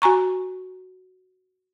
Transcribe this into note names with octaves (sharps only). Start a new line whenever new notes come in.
F#4 G#5 A#5 C#6